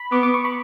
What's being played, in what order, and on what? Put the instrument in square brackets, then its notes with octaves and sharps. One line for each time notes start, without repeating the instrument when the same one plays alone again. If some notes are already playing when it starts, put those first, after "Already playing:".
Already playing: [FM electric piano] B5
[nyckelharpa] B3 [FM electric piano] D6
[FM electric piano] D6
C#6
B5